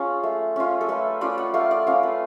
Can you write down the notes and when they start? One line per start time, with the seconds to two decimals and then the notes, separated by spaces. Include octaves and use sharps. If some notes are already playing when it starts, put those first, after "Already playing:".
Already playing: C#4 F4 G#4
0.23 A3
0.56 C#4 F4
0.81 A4
0.89 A3 B4
1.21 C#4 F4 D5
1.38 F#5
1.54 A3 F5
1.71 D5
1.87 C#4 F4 F5
2.03 B4